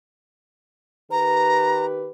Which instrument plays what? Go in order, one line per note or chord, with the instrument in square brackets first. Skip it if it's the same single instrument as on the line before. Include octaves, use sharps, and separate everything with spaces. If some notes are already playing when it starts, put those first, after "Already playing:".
[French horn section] D#3 G4 B4 [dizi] A#5